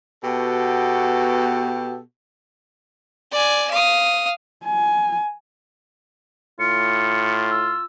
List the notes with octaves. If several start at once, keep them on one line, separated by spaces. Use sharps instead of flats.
B2 B3 F#4 G4 A4 G5
D5 G#5
F5 D#6
G#5
A2 F4 C#7
E6